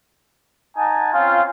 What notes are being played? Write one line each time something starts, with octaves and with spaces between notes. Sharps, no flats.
D#4 F#5 G#5 A5
C4 C#4 F4